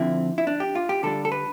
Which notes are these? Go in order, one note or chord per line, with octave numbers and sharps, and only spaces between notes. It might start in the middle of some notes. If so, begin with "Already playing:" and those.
Already playing: D3 F3 C4 E4
E4
D4
G4
F4
G4
D3 G3 D4 A4
A4
B4